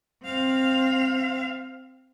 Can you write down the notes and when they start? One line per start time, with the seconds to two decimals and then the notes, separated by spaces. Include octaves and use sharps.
0.24 C4 F5